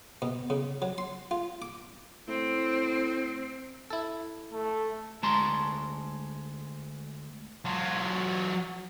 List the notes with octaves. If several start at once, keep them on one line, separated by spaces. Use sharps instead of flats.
B2
C#3
F#3
C6
F4
D6
A2 C4
E4 A4
A3
D2 G#3 A5 A#5 C6
F#3 F4